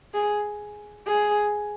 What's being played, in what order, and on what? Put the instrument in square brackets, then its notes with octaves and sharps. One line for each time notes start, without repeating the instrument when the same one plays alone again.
[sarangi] G#4
G#4